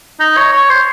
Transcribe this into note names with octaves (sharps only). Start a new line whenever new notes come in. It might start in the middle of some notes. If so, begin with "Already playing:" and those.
D#4
C#5
C#5
C5